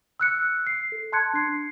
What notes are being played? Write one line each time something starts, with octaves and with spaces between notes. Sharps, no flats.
E6 F#6 C#7
C7
A4
A5 C6 F#6 G#6 C#7
D4 C7